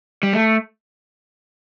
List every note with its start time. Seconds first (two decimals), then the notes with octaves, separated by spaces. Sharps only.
0.23 G3
0.33 A3